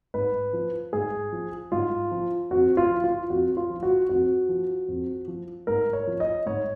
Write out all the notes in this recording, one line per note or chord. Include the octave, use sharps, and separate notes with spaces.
G#2 B4
F3
G#2 G#4
F3
G#2 F4
F3
F2 F#4
F4
F3
F4
F2 F#4
F4
F3
F#4
F2 F#4
F3
F2
F3
G#2 A#4
C#5
F3
D#5
G#2 C#5